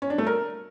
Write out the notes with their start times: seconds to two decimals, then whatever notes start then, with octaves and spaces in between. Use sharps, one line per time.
0.02 C#4
0.10 D4
0.18 A3
0.27 A#4